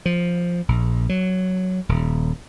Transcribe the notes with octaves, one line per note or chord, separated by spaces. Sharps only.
F3
A#1
F#3
D#1